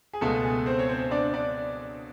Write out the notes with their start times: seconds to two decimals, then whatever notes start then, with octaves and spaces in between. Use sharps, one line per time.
0.13 G#4
0.21 C#2 B2 G#3 A3 A4
0.44 G#4
0.66 C4 C5
0.79 C#5
0.89 C4 C5
1.11 D4 D5
1.34 D4 D5